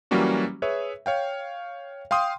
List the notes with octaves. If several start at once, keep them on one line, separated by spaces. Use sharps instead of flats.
E3 F#3 G3 A#3 C#4 F#4
G#4 B4 C#5 E5
C#5 F5 G5
F5 G5 C6 D#6